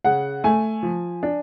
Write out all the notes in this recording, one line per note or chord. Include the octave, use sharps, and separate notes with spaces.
C#3 F#5
A3 G#5
F3
D4